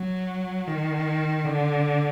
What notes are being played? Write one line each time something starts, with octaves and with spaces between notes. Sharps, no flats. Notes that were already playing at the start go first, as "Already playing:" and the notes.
Already playing: F#3
D#3
D3